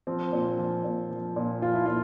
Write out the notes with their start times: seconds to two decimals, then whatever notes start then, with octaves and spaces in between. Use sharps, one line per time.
0.07 F3 C4
0.32 A#2
0.59 F3
0.84 A#2
1.11 F3
1.36 A#2
1.62 F3 F4
1.74 E4
1.86 A#2 F4